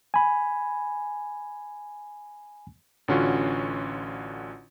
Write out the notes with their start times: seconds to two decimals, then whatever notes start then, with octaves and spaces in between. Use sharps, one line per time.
0.14 G#5 B5
3.08 A1 D3 C#4 F4 F#4